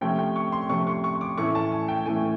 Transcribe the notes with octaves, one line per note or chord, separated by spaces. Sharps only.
C3 F3 A3 C#4 G5
G5
C#6
C6
C3 F3 A3 C#4 C#6
C#6
C#6
D6
A2 E3 A3 C#4 C#6
A5
G#5
G5
A2 E3 A3 C#4 G#5